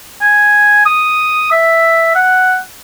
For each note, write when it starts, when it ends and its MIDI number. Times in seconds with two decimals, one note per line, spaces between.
0.21 0.81 80
0.86 1.51 87
1.52 2.15 76
2.15 2.57 78